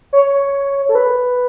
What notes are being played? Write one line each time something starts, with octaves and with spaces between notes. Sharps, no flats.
C#5
A4
B4